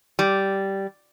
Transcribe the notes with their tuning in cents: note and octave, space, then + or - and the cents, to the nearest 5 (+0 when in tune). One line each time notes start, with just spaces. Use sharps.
G3 -10